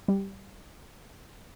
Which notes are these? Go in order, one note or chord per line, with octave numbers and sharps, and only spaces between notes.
G3